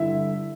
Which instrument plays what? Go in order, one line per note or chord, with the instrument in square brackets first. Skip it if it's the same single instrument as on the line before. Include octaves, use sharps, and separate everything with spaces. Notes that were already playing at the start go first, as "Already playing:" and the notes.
Already playing: [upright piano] G2 D3 E4 E5